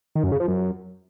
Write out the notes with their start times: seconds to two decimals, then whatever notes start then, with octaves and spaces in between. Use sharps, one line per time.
0.15 D#3
0.24 F#2
0.32 C#3
0.40 F3
0.48 F#2